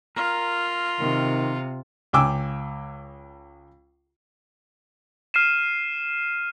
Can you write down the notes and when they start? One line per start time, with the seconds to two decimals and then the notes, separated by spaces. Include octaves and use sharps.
0.16 F4 A#4
1.00 C3 D#3
2.13 C#2 G5 G#5 D6 E6
5.34 F6 C7 D#7 E7